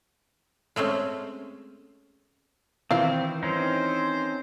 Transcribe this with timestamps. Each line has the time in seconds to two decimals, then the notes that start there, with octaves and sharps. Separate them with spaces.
0.76 G#3 A3 C4 C#4
2.91 D#3 E3 C4 E4 F4 F5
3.43 C4 C#4 D#4 C5